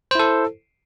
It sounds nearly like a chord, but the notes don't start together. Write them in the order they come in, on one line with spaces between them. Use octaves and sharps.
C5 E4 A4